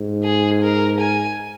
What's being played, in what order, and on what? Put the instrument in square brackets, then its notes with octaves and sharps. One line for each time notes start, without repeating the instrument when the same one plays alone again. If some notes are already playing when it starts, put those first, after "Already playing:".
Already playing: [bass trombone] G#2
[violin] G#4
A#4
G#5